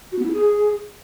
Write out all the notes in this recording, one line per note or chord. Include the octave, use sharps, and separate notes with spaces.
F#4
B3
E4
G#4